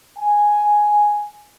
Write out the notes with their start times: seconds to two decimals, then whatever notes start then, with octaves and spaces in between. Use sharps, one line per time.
0.18 G#5